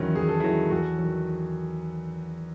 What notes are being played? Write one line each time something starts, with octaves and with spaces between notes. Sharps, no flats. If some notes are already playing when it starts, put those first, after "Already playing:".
Already playing: E2 D#3 F#3 C#4 E4
E2 G#4
A4
D#3 F#3 E4 G#4
E2 F#4 A4
D#3 F#3